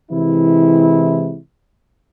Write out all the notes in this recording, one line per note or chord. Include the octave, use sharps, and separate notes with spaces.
C3 E3 G#3 E4